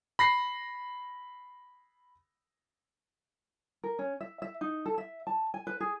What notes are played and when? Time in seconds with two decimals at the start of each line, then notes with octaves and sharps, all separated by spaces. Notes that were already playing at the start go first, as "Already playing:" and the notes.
0.19 B5 A#6 C7
3.84 A#4
3.99 C#4
4.21 E5
4.42 E5
4.61 D#4
4.86 A4
4.98 E5
5.27 A5
5.54 G#5
5.67 B4
5.80 G#4